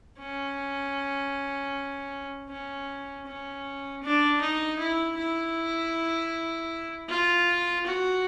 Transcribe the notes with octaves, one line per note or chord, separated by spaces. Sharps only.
C#4
C#4
C#4
D4
D#4
E4
E4
F4
F#4